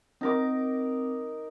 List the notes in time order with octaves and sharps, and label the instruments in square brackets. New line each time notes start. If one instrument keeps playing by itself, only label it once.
[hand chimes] C4 A#6 [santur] D#4 A#4 D6